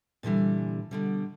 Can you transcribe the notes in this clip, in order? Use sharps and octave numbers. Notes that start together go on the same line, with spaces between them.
A#2 D3 E3 G3
B2 D3 G3